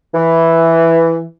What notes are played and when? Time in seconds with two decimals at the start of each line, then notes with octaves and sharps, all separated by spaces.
0.14 E3